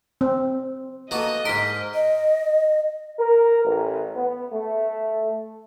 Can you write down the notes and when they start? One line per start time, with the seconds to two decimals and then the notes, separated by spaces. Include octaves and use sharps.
0.21 C4
1.11 A#3 B3 F#4 A4 D#5
1.45 G#2 A#4 C5 C6 F6 B6 D7
1.94 D#5
3.19 A#4
3.64 A1
4.15 B3
4.52 A3